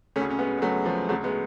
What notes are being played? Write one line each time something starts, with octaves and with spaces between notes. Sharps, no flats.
C#3 A3 C#4
D2
C#4
G#3 B3
G#3
F#3 A3
F3 G#3
D2 C#3 F#3 A3
G#3 B3